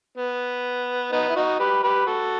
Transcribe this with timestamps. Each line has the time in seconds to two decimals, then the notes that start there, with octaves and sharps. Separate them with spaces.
0.17 B3
1.12 B3 D#4
1.29 E4
1.36 D#4 F#4
1.60 G4 B4
1.83 G4 B4
2.06 F#4 A4